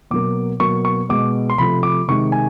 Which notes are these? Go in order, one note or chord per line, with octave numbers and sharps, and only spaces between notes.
B2 F#3 A#3 D6
B2 F#3 A#3 C#6
C#6
B2 G#3 D6
C6
C3 F3 A3 B5
D6
C3 D#3 G#3 C#6
G#5